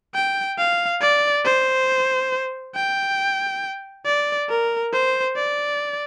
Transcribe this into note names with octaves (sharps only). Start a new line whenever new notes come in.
G5
F5
D5
C5
G5
D5
A#4
C5
D5